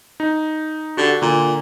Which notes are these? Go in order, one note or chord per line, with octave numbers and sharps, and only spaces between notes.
D#4
D3 F#4 G4
A#2 D3